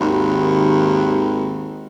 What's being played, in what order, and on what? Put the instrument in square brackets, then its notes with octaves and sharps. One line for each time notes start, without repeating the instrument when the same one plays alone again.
[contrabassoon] G#1 [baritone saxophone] D#2